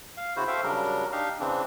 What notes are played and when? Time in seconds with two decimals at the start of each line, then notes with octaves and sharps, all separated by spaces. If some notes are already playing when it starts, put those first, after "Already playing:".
0.17 F5
0.36 C#3 E4 F#4 C5
0.48 A4 C5 E5 F5 G5
0.63 C#3 F#3 G3 D4 A#4
1.12 D4 D#4 G4 F5
1.40 C#3 E3 C4 D4